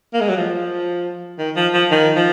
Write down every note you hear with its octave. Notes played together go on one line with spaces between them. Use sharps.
A#3
G#3
F#3
F3
D#3
F3
F3
D#3
F3